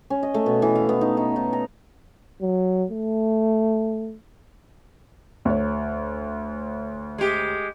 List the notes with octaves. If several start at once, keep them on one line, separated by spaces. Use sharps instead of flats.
C#4
D#5
A3
B2
E3
F5
B3
D#4
D#4
D#4
A#5
F#3
A3
D2 C#5
G#3 G4